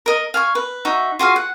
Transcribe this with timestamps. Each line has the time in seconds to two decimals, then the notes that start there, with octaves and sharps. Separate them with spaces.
0.06 A#4 D#5
0.34 F5 G#5 C#6
0.55 B4
0.85 D#4 F#4 E5
1.19 F4 F#4 G#4 F5
1.36 F#5